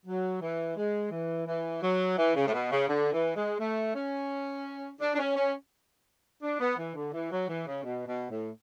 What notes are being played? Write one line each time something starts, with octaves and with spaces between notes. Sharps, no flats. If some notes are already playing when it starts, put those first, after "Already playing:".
F#3
E3
G#3
E3
E3
F#3
E3
C#3
A2
B2
C#3
D3
E3
G#3
A3
C#4
D4
D4
C#4
C#4
D4
B3
E3
D3
E3
F#3
E3
C#3
B2
B2
A2